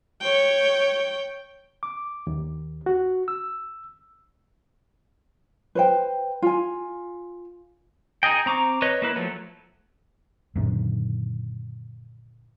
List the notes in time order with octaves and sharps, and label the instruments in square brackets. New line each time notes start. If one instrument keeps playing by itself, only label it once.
[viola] C#5 G5
[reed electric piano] D6
D#2
F#4
E6
[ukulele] B4 C5 G5
F4 G#5
[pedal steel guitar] D#4 G#4 D#5 G5
C4 A#5 C#6 D6
B4 C#5 D#5
A#3 E4 B4
F3 F#3 A3
[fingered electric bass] F#2 A#2 D3 D#3